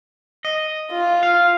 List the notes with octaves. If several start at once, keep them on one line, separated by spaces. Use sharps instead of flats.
D#5
F4
F5